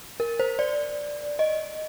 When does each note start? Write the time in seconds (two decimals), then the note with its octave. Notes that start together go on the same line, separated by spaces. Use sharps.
0.20 A#4
0.40 C5
0.59 D5
1.39 D#5